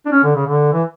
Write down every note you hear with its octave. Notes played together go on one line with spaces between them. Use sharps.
D4
C#4
D3
C#3
D3
E3